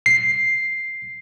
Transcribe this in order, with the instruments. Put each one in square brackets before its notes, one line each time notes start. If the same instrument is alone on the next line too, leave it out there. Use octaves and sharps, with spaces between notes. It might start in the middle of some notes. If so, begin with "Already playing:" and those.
[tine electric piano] C7